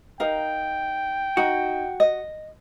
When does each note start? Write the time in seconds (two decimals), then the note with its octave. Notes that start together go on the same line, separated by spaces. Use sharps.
0.20 D#4 A#4 F5 G5
1.37 D#4 F#4
2.00 D#5